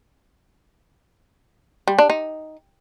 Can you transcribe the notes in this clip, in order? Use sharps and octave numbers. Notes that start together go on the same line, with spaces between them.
G3
D4
D#4